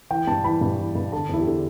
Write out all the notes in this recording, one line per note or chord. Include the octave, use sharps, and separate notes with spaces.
E3 G5
G2 A5
E3 B5
G2
E3
G2
D3 A5
E2 E4
G4
D3